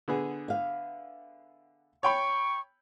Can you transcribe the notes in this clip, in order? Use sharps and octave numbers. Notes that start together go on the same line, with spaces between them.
D3 B3 G#4
E5 F5
C#5 G5 B5 C#6